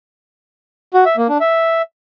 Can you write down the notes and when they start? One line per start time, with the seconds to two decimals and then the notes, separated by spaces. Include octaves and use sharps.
0.94 F#4
1.05 E5
1.17 A#3
1.29 D4
1.41 E5